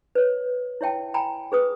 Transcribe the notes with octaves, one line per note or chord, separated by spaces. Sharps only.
B4 C#5
E4 C#5 E5 G5 A5
G5 G#5 A#5 B5
G#4 B4 D#6